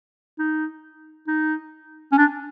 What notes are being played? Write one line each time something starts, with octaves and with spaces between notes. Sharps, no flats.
D#4
D#4
C#4
D4